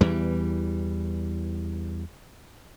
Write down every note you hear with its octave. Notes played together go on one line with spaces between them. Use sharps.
E2 E3 G3